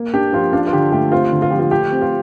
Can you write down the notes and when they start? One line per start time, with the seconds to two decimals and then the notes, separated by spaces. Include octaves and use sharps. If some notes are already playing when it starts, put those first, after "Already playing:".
Already playing: A#3
0.14 D4 G4
0.33 F3 F4
0.53 D4 F4
0.67 F4
0.73 D3 G4
0.92 A3 G4
1.12 C4 F4
1.32 D3
1.42 F4
1.50 F3 G4
1.59 F4
1.71 A3 G4
1.92 C4
2.02 F4